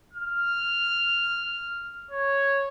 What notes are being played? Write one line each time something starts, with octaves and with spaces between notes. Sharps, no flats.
F6
C#5